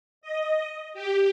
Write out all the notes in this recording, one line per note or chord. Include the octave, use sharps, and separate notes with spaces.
D#5
G4